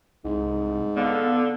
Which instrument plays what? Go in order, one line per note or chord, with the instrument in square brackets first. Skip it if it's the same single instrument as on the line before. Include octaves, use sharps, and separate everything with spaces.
[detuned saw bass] C2 [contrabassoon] G#2
[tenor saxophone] D3 [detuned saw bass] B3 [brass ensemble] A4 F5